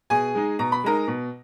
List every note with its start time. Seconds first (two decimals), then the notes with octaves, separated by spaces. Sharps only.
0.10 B2 G#4 G#5
0.35 G#3 D#4
0.59 B2 A#5
0.72 B5
0.84 G#3 D#4 A#4 A#5
1.08 B2